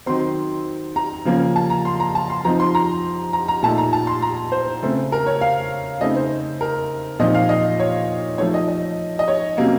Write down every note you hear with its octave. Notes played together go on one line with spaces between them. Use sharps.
D#3 F#3 C4 C6
A#5
C#3 F3 A#3 C#4
A5
A#5
C6
A#5
A5
C6
F3 C4 D#4 A#5
C6
A#5
A#5
A#5
A#2 A3 D#4 A5
A#5
A5
C6
A#5
C5
C#3 A3 C4
A#4
C#5
F5
C#3 A3 C4 D#4 D#5
C5
A#4
A#2 F3 C4 D#4 D#5
F5
D#5
C#5
F3 A3 D#4 C#5
D#5
D#5
D#5
C#5
C3 F#3 A#3 C#4